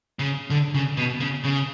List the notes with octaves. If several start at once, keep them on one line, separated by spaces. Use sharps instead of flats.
C#3
D3
C#3
B2
C#3
C#3